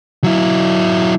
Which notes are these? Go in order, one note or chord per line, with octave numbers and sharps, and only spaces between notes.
F#3 E4